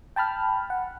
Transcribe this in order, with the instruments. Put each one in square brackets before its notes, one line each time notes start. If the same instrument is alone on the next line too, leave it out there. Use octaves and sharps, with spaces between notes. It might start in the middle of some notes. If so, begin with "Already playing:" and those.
[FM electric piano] G5 A5 B5 F6
F#5